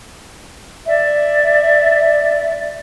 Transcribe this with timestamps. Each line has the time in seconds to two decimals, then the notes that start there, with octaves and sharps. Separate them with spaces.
0.86 D5 E5